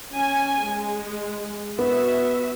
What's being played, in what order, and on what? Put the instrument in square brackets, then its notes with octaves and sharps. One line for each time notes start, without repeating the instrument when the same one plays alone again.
[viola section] C#4 G#5
G#3
[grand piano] B3 [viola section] F#4 E5